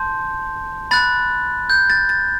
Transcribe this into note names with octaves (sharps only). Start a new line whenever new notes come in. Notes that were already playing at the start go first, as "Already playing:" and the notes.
Already playing: A5 C6 G6
B5 F#6 A6
G6
A6
A6